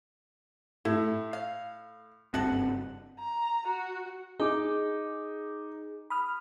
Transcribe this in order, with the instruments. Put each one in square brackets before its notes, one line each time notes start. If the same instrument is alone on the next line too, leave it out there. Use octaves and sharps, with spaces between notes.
[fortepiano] A2 [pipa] E4
[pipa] F5
[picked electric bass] F#1 G2 C4 [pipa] F#4 A4 F#5
[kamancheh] A#5
F#4
[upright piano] D#4 D6 [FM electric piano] G#4
[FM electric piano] B5 D#6 F6